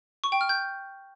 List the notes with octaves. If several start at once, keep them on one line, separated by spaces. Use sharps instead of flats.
C#6
G5
F6
G6